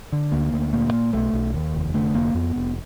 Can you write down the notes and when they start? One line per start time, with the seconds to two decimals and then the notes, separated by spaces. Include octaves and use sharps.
0.12 D3
0.32 D2 A#3
0.53 D2
0.73 A#2 A#3
0.93 A#2
1.13 B1 A3
1.33 B1
1.54 D#2
1.74 F1
1.94 D3 A3
2.14 F1 A#3
2.35 F2 B3
2.56 F1